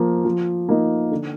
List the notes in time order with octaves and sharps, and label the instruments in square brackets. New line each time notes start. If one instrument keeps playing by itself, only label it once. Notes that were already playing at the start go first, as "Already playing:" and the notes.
Already playing: [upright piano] F3 A#3
F3
A#3 D#4
D3